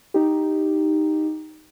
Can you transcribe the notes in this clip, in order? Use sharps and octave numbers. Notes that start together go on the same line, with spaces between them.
D#4 G4